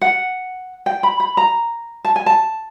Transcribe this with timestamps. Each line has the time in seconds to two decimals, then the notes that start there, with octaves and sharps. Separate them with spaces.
0.01 F#5
0.86 G5
1.03 B5
1.20 B5
1.37 A#5
2.05 A5
2.16 G#5
2.26 A5